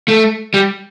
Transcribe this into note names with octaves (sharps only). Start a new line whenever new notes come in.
A3
G3